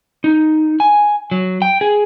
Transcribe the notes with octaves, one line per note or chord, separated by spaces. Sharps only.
D#4
G#5
F#3
G5
G#4